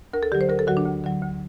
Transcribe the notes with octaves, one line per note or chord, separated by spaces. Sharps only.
D2 A#4
A4
D3 F#3 G4
C5
D2 A#4
A4
D3 F#3 F#4
D4
D2
D3 F#3
D2